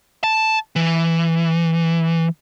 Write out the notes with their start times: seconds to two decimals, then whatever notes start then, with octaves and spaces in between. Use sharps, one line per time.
0.24 A5
0.76 E3